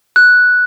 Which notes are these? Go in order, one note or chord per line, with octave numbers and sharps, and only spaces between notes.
F#6